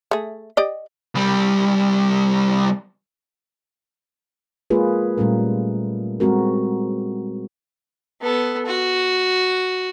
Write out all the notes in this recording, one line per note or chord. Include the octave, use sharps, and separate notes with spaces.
A3 G#4
G4 D5 D#5
C2 G3
G#3 A#3 F4 G#4 B4
A#2 G3 A3 C#4 A#4
G3 G#3 C4 F#4 A#4
B3 A4
F#4